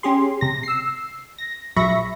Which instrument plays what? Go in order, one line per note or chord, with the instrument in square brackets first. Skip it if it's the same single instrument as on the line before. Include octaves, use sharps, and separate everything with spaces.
[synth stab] C#4 G4 G#4 C6
C3 A#6
E6 C7
A#6
A#1 F#3 E5 B5 C#6 A#6